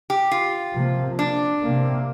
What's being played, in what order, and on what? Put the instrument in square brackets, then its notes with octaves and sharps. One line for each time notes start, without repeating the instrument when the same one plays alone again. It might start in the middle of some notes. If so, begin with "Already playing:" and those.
[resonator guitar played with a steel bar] G4
F4
[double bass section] C3 F3 A#3
[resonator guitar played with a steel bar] D4
[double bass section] C3 A#3